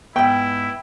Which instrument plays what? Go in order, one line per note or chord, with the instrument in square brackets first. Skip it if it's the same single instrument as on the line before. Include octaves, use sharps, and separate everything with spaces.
[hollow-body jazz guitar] G#2 B3 [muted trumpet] E4 [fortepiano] G5